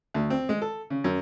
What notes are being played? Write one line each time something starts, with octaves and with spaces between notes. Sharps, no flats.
D2
C4
G#3
A4
C#3
F#2